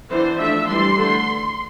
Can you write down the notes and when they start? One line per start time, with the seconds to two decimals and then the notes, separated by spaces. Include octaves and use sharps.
0.11 E3 B3 D4 C5
0.39 F3 A3 D4 E5
0.68 E3 G3 D4 C6
0.97 D3 A3 D4